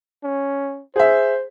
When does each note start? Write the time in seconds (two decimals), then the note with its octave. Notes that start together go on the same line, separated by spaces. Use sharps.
0.24 C#4
0.96 G#4 C5 E5